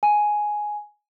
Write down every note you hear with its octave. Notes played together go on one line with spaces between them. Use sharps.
G#5